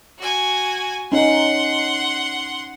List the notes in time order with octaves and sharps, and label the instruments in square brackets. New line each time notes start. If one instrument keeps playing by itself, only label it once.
[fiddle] F#4 G#5
[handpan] C#4 D#4 [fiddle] F#5 C6